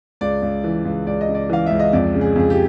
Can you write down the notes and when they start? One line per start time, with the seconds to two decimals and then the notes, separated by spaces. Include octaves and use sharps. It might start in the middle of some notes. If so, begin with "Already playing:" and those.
0.21 C#2 D5
0.42 C#2
0.64 E3
0.85 C#2
1.07 C#2 D5
1.21 D#5
1.28 C#3
1.34 D5
1.49 E3 F5
1.66 C#2 E5
1.80 D#5
1.93 F2 D5
2.14 C#3
2.21 G#4
2.36 F2 G#4
2.50 G4